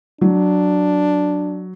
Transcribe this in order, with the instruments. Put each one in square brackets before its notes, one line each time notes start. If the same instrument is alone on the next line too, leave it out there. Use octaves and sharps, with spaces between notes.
[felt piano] F#3 [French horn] D4